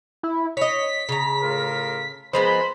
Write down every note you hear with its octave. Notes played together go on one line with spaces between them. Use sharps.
E4
C#5 D#5 B6
C#3 A#5
A2 F4 A#4
F3 G#3 B3 A#4 C5 B5